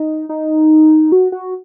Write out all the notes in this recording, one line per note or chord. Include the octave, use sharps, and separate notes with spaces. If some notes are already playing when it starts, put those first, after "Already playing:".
Already playing: D#4
D#4
F#4
F#4